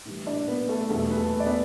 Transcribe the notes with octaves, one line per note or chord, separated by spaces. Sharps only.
A2 E3 G3
D4 D5
B3 B4
A3 A4
E2 B2 G3 A3 A4
B4
A3 A4
D5
B3 B4